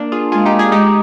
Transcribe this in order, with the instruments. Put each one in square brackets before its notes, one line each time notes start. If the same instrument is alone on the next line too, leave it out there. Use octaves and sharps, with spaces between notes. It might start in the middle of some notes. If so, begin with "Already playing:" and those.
Already playing: [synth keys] A#3 D4
F4 G#4
[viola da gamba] G#3 [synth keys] F4 G#4
[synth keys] D#4 G4
F4 G#4
[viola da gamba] G#3 [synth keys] D#4 G4